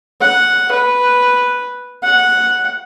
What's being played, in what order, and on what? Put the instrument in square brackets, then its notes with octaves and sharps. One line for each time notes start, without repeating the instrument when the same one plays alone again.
[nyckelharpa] F#5
B4
F#5